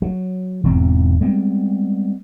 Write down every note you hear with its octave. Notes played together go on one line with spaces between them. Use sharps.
F#3
E1 E2 G#2 C4
G3 G#3 B3 C4